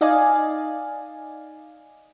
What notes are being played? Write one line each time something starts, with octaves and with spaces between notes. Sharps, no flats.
D#4 D5 D#5 F5 G#5